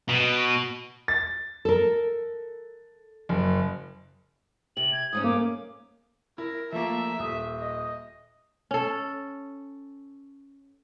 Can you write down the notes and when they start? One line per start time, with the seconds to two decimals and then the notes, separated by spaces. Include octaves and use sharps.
0.09 B2
1.08 A6
1.65 A4 A#4
3.29 F#1
4.77 C3 F#7
4.92 G#6
5.13 G#2 A3 C#4 D#6
5.24 A#3 D6
6.38 E4 A#4
6.72 F3 A3 A#3 E5
7.19 D#1 D#6
7.60 D#5
8.71 C#4 A4